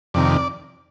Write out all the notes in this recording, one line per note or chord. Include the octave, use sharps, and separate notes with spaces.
F2 C3 D#3 D5